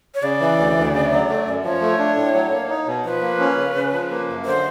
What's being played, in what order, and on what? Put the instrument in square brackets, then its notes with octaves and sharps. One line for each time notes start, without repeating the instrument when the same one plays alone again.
[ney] C#5
[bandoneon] C#3 [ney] D5
[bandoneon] E3
D2
D2
C#3
F#3
A3
F#2
[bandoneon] F3 [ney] C#5
[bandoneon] A3
D4
A2
F#3
A#3
D#4
B2
[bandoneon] F3 [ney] B4
[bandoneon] A#3
C#4
C#3
C#3
F3
A#3
F#2
[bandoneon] D3 [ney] C5